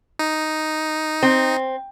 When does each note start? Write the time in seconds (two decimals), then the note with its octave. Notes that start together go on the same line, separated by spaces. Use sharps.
0.19 D#4
1.23 C4